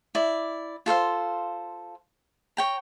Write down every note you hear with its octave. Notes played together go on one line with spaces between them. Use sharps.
E4 D5
F4 A4 C5 F5
C#5 G5 A#5